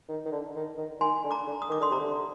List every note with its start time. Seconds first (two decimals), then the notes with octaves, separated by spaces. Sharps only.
0.09 D#3
0.25 D#3
0.32 D3
0.55 D#3
0.77 D#3
1.00 D#3 G#5 C6
1.24 D3
1.31 A#5 D6
1.47 D3
1.62 D#6
1.69 D#3 D6
1.80 D3 C6 D#6
1.91 C3 A#5 D6
2.01 D3